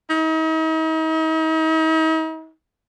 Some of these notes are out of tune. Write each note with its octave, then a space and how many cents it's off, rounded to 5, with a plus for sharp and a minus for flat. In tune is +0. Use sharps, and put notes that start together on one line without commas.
D#4 +45